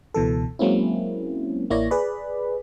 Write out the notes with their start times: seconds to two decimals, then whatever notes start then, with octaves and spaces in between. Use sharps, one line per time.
0.14 C#2 B2 E3 A4
0.59 F#3 G#3 A#3 C4 C#4 E4
1.70 A1 A#3 E4 C#5 D5 A#6
1.91 G#4 B4 D5 B5